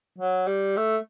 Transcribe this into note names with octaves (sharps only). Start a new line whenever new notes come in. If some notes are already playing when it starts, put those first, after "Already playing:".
F#3
G3
A3